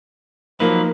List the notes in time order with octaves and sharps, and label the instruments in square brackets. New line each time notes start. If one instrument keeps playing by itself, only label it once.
[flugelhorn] F3 [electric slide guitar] F#3 A#3 B4 [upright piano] D#4 [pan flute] A#4